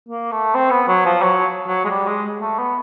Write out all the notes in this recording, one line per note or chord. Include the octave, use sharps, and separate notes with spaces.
A#3
A3
C4
B3
F#3
F3
F#3
F#3
G#3
G3
G#3
A3
B3